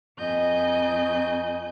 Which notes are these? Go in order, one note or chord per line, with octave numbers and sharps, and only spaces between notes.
F2 D#5 G#5 G6